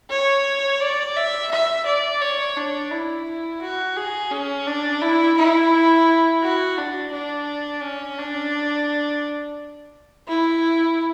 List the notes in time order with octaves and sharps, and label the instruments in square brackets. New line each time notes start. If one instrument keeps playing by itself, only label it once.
[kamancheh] C#5
D5
E5
E5
D5
C#5
D4
E4
F#4
G#4
C#4
D4
E4
E4
F#4
D4
D4
C#4
D4
E4